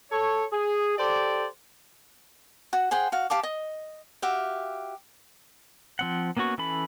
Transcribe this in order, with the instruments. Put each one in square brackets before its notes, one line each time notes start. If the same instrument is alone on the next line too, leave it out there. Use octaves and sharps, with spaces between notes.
[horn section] A4 C#5
G#4
G4 A4 C5 D5
[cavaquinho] F#4
G#4 C5 F#5 G5
F#4 F5
G4 F5 A5 D6
D#5
F#4 G4 E5 F5
[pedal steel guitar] F3 C4 F#5
A#3 B3 C#4 F#4 C#6
E3 C#4 A4 B5